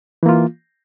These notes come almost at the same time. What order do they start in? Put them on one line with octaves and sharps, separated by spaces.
E3 A#3 F4